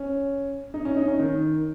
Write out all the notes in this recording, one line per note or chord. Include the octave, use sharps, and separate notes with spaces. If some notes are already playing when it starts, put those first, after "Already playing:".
Already playing: C#4
D#4
C#4
D#4
C#4
D#3